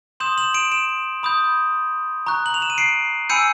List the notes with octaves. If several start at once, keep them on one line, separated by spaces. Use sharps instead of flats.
C6 D#6 G6 E7 F#7
E7 F#7
D7 E7
D7 E7
B5 D#6 G6
A#5 C#6 F#6
F#7
F7
E7
D#7
C7 D7
G#5 B5 E6 G6 C#7 D#7